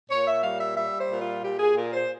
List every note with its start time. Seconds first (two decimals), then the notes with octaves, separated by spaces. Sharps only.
0.10 A#2 C#5
0.26 E5
0.43 G3 F5
0.60 E5
0.77 G3 E5
0.99 C5
1.10 A#2
1.21 F4
1.43 A#2 G4
1.60 G#4
1.76 A#2 A#4
1.93 C5